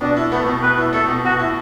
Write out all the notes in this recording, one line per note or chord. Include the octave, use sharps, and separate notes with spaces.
B2 D4
E4
A3 B3
B2
B2 B4
E4
A3 A4
B2
B2 F#4
E4